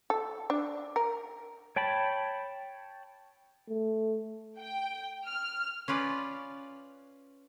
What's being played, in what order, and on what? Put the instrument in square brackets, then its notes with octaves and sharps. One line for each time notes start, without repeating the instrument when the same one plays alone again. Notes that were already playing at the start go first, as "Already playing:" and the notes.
[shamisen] A4
D4
A#4
[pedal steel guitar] C#5 G5 A5 B5
[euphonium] A3
[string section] G5
F6
[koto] C#4 F4 B4 D5